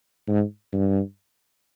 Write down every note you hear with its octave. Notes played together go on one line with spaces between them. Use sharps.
G#2
G2